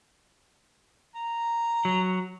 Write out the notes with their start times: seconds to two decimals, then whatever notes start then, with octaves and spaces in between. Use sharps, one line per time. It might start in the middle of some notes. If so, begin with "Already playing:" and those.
1.15 A#5
1.85 F#3